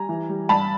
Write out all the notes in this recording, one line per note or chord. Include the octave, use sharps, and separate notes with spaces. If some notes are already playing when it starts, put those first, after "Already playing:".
Already playing: G3 G#5 A#5
E3
G3
G2 A5 B5